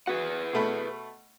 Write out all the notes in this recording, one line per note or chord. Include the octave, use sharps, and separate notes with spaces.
F#4 G#4 B4 F#5
B2 A3 B5